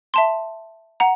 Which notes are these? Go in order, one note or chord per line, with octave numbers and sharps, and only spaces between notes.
E5 A5 C6
F#5 A#5